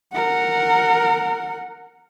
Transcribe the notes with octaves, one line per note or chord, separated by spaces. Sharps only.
A#4 F#5